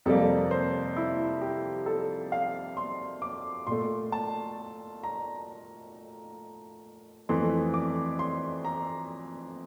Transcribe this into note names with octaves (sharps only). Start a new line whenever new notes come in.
F2 C3 G3 A#3 A4
C5
E4
G4
A4
F5
C6
D6
A#2 A3 C6
A5
A#5
F2 E3 A3 C6
D6
C6
A#5